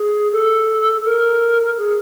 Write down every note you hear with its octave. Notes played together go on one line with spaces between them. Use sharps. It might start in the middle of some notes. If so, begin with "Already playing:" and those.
Already playing: G#4
A4
A#4
G#4